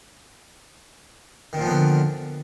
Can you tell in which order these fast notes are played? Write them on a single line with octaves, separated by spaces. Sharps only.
D#3 A#2 F3 B3 D3